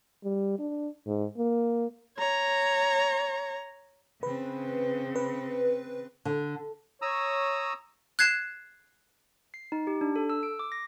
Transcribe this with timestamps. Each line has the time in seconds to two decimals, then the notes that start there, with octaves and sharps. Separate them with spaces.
0.24 G3
0.59 D4
1.06 G#2
1.38 A#3
2.18 C#5 A#5
4.23 C#3 C4 B4
5.16 B4
6.25 D3
7.02 C#5 A#5 D#6 E6
8.19 F#6 G#6 C7 E7
9.54 C7
9.72 D#4
9.87 G4
10.01 D4
10.16 A4
10.30 E6
10.43 D7
10.59 D6
10.72 A#6